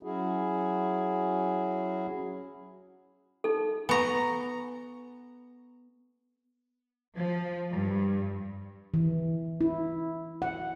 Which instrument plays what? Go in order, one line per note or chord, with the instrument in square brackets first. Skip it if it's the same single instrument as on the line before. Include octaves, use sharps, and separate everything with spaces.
[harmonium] F#3 C#4 E4 F#4 G#4
[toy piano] D#4 A4
[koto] B3 A#5 [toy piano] G#5 C#6
[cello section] F3
G2
[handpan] E3
E4
F#5